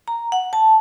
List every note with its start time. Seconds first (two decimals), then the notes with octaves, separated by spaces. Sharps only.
0.08 A#5
0.32 F#5
0.53 A5